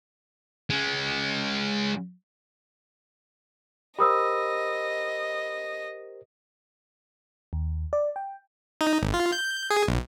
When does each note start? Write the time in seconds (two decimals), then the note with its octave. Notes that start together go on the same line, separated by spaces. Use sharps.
0.70 G#3 C#4
3.99 G4 A#4 C5 D#5 B5 D#6 E6
7.53 D#2
7.93 D5
8.16 G5
8.81 D#4
9.02 G#1
9.14 F4
9.32 G6
9.70 G#4
9.88 B1